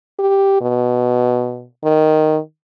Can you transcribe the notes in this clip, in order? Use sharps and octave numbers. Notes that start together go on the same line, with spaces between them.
G4
B2
D#3